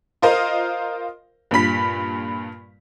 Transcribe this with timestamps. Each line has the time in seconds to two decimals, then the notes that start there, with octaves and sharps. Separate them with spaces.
0.22 F4 A#4 C5 D#5 F5
1.51 G2 A#2 B5 B6